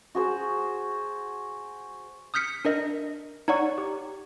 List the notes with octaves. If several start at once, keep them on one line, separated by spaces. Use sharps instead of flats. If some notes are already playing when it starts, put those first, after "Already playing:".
F#4 G#4 C5
D#6 F6 G6 B6 C#7
D4 A#4 D#5
D#4 C#5 D5 F#5 C#6
G4